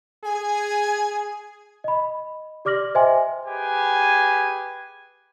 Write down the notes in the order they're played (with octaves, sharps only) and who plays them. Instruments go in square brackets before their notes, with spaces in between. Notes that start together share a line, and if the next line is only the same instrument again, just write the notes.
[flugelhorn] G#4 [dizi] G#5
[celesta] D#5 B5
G4 D5 D6 F6 A#6 F#7
C5 D#5 E5 G5 G#5 C6
[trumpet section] G4 G#4 B4 G#5